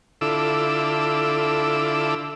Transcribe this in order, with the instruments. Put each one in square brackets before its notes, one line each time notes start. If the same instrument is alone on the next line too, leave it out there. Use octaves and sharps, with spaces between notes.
[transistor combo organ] D3 E4 F4 A4 D6 E6